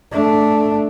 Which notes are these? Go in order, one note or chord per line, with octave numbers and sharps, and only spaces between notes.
A3 D4